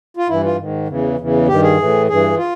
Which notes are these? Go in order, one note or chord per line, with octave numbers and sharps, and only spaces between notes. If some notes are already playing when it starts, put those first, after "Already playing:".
F4
G2 E3 E4
F4
G#2 D#3
E2 C#3 E3
E2 C#3 E3
G2 D#3 G4
G#4
A2 E3
G2 E3 G#4
F4